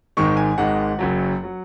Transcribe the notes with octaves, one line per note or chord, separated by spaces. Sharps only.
G#1 G#2 D#3 G#3 C#6
G#5
G#1 G#2 D#3 G#3 F#5
F#1 F#2 F#3
F#3